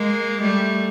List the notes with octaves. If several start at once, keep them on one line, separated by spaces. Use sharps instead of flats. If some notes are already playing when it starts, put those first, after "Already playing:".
Already playing: G#3 A#3
G3 A3